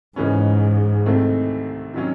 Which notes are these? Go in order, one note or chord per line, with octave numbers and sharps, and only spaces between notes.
C#2 G#2 C#3 E3 G#3 C#4
C2 C3 D#3 A3 C4
C3 D#3 F#3 C#4